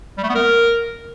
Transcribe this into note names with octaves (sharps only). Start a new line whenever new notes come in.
G3
A3
B3
A#4